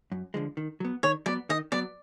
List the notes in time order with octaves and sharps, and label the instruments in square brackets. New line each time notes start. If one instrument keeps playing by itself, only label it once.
[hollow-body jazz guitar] F#2
D3 F3 G#3
D#3
F#3 B3
[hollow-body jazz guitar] D#3 [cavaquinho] C#5
[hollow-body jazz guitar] F#3 B3 [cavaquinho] D5
[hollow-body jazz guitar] D#3 [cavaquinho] D#5
[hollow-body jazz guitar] F#3 B3 [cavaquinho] D5